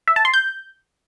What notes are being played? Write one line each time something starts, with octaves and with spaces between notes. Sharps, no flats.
E5
A5
C6
G6